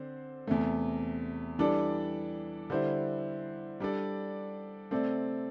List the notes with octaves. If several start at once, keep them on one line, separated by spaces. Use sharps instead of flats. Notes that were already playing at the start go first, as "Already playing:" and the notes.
Already playing: D3 C4 C5
E2 C3 A3
E3 G3 D4 A4 D5
D3 G3 E4 C5
G3 D4 A4 D5
C3 A3 C4 A4 D5